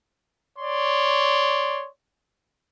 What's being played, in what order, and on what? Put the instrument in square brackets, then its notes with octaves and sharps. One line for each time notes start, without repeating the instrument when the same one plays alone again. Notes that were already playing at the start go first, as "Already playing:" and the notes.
[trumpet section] C#5 D5 C6